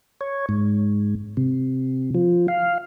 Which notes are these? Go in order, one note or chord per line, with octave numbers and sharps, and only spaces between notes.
C#5
G#2
C3
F3
F5